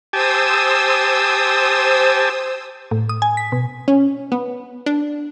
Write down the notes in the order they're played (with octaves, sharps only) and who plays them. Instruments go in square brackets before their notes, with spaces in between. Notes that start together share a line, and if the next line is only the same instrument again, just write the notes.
[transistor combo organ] G4 G#5 A5 [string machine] C5 D#6 E6
[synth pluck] A2
D#6
G#5
B6
B2
C#4
B3
D4